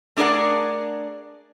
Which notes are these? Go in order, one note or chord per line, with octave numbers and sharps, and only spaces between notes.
A3 D4 G#4 A#4 D5 F#5